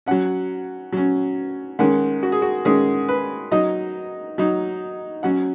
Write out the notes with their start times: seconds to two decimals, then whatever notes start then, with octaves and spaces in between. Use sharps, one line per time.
0.06 F#3 C#4 F#5
0.92 F#3 C#4
1.79 D#3 G#3 C#4 F#5
2.23 F#4
2.32 G#4
2.42 F#4
2.65 D#3 G#3 C#4 G#4
3.09 B4
3.52 F#3 D#4 D#5
4.38 F#3 D#4
5.23 F#3 C#4 F#5